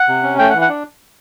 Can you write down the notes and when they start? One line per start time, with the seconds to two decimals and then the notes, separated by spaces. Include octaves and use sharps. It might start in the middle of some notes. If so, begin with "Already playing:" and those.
Already playing: F#5
0.08 C3
0.23 C#4
0.39 A3 G5
0.50 F#5
0.54 E3
0.62 F#5
0.69 D4